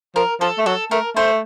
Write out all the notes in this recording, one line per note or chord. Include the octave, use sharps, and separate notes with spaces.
F3 A#4
F3 A4
A3
F#3 A4
A3 A#4
A3 C5